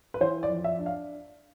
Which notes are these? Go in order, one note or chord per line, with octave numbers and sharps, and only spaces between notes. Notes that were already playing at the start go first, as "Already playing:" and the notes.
B4
E3 C5
D5
F2
E5
D4
F5